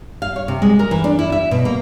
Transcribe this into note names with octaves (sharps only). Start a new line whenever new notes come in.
F5
C#5
C3
G#3
A#4
E3
D4
E4
E5
B2
A#3